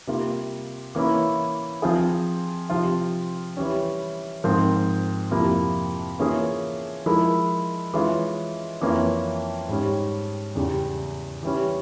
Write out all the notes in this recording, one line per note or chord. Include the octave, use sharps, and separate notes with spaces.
C3 G3 A#3 F4
E3 A#3 C#4 E4
F3 C4 F4 G#4
C3 F3 C4 F4
E3 G3 C#4
G#2 F3 C4 F4 A#4
F2 C3 F3 A#3 E4
E3 A#3 C#4 F4 G#4
F3 G#3 E4 A#4
E3 G#3 C#4 F4
F2 E3 A#3 C#4 F4
G#2 G3 C#4
E2 C#3 G3
E3 G3 C#4